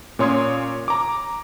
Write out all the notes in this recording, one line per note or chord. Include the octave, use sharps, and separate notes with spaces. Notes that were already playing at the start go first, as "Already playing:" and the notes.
A#2 C#4 C#5 C6 D#6 G#6
A#5 D6